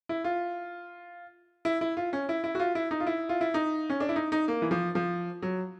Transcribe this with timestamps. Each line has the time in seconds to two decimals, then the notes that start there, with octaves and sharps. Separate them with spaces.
0.09 E4
0.24 F4
1.65 E4
1.81 E4
1.97 F4
2.13 C#4
2.29 E4
2.44 E4
2.55 F#4
2.60 F4
2.75 E4
2.91 D#4
3.00 F4
3.07 E4
3.29 F4
3.41 E4
3.54 D#4
3.90 C#4
4.00 D4
4.09 E4
4.16 D#4
4.32 D#4
4.48 A#3
4.62 E3
4.71 F3
4.95 F3
5.42 F#3